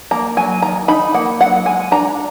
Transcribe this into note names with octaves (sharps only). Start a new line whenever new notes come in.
A#3 A#5
F#3 G#5
D#3 A#5
D#4 B5
A#3 F#5
F#3 F#5
G#3 G#5
D4 A#5